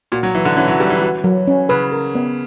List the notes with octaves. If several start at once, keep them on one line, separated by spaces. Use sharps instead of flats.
A#2 F#4
F#3
E3 F#3
D3
E3 C#4
F#3
G3 B4
E3
F#4
F#3
C#4
C#3 B4
A#4
B3